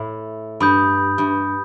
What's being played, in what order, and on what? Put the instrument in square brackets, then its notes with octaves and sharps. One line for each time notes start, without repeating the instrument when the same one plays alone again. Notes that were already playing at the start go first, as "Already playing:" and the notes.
Already playing: [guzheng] A2
[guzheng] G2 [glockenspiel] B5 D#6 G6
[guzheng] G2